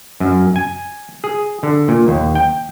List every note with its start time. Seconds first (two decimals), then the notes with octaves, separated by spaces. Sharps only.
0.20 F#2
0.56 G#5
1.24 G#4
1.63 D3
1.88 A#2
2.08 D#2
2.35 G5